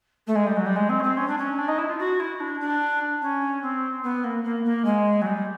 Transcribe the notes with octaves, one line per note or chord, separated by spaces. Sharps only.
A3
G#3
G3
F#3
G3
G#3
C4
C#4
C4
C#4
D4
C#4
D4
D#4
E4
F4
F#4
E4
D4
D4
C#4
C4
B3
A#3
A#3
A#3
G#3
F#3
G3